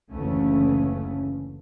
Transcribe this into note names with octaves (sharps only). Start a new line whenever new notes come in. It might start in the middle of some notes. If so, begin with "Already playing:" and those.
F#1 D2 C#3 E3 A3 C#4